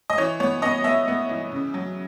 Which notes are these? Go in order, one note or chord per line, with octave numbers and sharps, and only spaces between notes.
D#5
E3 C#5
B3 C#5
B3 D#5
B3 E5
B3
E3
C#3
F#3